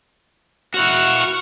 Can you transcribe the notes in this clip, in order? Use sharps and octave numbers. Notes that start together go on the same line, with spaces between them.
E4 F#4 F#5 C#6 F6